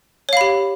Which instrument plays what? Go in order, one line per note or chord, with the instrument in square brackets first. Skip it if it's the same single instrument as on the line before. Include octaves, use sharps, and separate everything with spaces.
[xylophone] C#5
F5
B5
G4